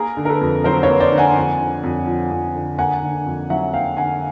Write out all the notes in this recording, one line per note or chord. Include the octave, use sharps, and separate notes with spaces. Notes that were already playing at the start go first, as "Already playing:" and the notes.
Already playing: A#3 G#4 A#4
D3
A#4
A4 B4
F2
F#3 A#4 C5
B4 C#5
A#3
C5 D5
D3
F#5 G#5
F2
D3
F2
F3
F2
D3
A#3 F#5 G#5
D3
F2
F#3 E5 F#5
A#3 F5 G5
D3 F#5 G#5